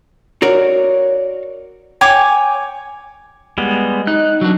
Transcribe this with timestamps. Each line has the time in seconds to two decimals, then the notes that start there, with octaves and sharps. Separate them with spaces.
0.42 F#4 A#4 C#5 D5
2.01 C#5 G5 G#5 D6
3.58 G3 G#3 B3
4.07 D#4 F#6
4.41 F#3 D4